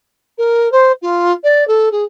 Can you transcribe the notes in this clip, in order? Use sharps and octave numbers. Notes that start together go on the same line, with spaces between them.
A#4
C5
F4
D5
A4
G#4